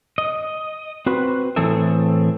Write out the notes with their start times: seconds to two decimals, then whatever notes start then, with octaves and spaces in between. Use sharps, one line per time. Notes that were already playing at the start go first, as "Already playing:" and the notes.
0.18 D#5
1.06 C4 F#4 B4 C5
1.56 A2 E3 C4 G#4 A4 E5